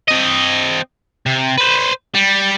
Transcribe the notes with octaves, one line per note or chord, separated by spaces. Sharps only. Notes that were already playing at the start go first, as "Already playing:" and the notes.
C4 D#5
C3
B4 C5
G3